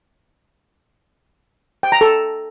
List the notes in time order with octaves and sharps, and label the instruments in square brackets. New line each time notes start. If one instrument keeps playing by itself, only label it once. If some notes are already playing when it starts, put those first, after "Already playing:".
[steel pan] G5
A#5
A4